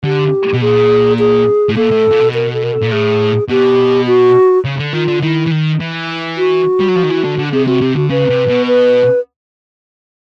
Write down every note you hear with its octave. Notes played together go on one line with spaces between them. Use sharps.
D3 G4
B2
A#2 G#4
G#4
A2
A#2 A4
A2
A#2
B2
A#4
A4
A#4
A4
A#2
A2 G#4
B2 G4
F#4
C#3
D3
D#3 F4
D3
D#3 E4
E3
D#3
E3
F#4
G3
F#3
F3
D#3
E3
D3
D3
C3 G#4
C3 F#4
C3 G4
D3 F#4
C#3 B4
C3
B2
B4